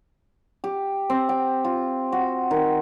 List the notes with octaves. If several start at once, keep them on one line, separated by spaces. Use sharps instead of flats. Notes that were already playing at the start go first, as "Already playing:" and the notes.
G4
C4
G5
F4
F#4
D#3